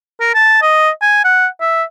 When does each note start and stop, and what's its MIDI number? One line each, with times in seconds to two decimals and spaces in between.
0.20 0.32 70
0.34 0.61 81
0.62 0.90 75
1.02 1.25 80
1.25 1.47 78
1.61 1.83 76